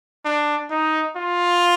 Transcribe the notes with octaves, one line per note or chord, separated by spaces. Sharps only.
D4
D#4
F4